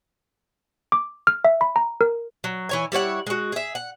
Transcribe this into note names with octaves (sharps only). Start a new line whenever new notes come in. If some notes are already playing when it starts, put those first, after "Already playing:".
D6
F6
E5
B5
A#5
A#4
F#3
E3 C#5 G#5
G3 E4 C#5 F#5
G#3 F#4
G#4 E5
F#5